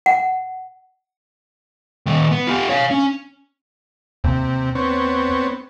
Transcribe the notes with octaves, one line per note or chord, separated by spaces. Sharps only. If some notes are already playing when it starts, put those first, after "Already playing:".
F#5
D#3 G3
B3
F4 G4
C#5 F5
C#4
D#2 C3
B3 C4 C#5